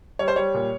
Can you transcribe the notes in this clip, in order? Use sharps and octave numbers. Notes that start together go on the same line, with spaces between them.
G3 C#5
C5
G3 C#5
A#2